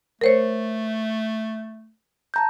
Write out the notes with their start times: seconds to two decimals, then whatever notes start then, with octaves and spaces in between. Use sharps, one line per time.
0.21 A3 A#4 C5 C#5
2.34 A5 A#5 G6